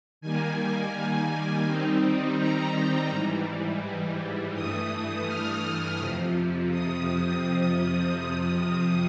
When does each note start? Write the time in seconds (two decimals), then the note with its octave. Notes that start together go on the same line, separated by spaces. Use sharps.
0.21 D#3 G3 A#3 G#5
1.66 D#3 G3 C4 D#4
2.38 A#5
3.10 G#2 E3 G3
4.54 G2 E3 A3 D#6
5.27 F6
5.99 F2 C3 F3
6.71 D#6